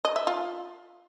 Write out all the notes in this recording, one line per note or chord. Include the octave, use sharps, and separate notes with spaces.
D#5
E5
F4